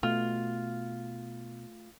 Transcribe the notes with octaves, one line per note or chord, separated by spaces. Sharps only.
B2 A3 F4